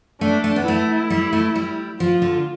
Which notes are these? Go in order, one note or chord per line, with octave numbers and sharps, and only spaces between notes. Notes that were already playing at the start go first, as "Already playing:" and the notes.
A3 D4
A3
B3
A3 E4
G3
A3
G3
F3 F4
D3